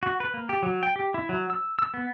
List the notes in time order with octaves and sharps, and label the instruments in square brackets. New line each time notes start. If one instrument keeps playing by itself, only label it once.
[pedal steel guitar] F#4
B4
A#3
G4
F#3
G5
G4
E4
F#3
E6
E6
B3